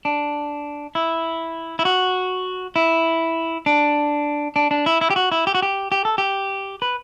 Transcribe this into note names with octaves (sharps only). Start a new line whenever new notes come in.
D4
E4
E4
F#4
E4
D4
D4
D4
E4
E4
G4
F#4
E4
G4
F#4
G4
G4
A4
G4
B4